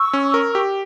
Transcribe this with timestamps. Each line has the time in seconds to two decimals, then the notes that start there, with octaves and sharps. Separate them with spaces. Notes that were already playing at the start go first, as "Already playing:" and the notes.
Already playing: C#6 E6
0.13 C#4
0.34 A#4
0.55 G4